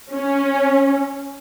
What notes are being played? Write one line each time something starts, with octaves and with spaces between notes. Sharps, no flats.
C#4